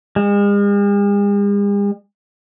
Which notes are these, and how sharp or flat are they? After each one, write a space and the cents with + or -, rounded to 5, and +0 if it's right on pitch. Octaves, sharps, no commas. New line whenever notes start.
G#3 -45